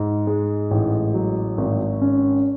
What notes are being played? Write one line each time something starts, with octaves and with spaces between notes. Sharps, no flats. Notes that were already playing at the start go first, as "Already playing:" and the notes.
Already playing: G#2
G#3
A1
F#3
G#1
C#4